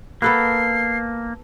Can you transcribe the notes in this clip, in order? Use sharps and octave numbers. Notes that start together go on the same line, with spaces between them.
A#3 B3 A4 B4 C7